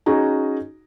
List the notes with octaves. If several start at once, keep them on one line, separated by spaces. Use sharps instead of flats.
C#4 D#4 F#4 G#4 A#5